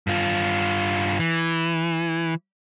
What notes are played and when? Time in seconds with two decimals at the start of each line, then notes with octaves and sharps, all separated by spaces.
0.07 G2 F4
1.19 E3